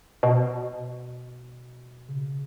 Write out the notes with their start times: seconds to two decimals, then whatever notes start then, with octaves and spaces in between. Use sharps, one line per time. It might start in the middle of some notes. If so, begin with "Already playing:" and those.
0.23 B2
2.09 C#3